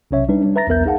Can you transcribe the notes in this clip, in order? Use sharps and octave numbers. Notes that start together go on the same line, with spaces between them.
B1 C3 C#4 C#5 E5
G3 D4 D#4 B4
G3 D4
B4 E5 A#5 A6 A#6
B1 E2 B3 A#4 E5 G6
D#4 G#4 F5 F#5 A5